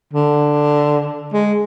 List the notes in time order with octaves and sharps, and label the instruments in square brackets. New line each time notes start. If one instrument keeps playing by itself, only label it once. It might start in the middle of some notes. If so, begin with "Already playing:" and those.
[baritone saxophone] D3
G#3